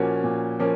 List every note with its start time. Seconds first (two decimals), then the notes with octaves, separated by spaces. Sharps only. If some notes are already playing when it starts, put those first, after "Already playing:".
Already playing: A#2 F3 A#3 C#4 F#4
0.24 A#2
0.59 F3 A#3 C#4